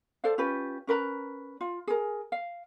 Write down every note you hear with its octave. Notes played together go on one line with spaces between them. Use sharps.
A4 C5 D5 F5
C#4 F4 G4 B4
C#4 A#4 B4 A#5
F4
G#4 A#4
F5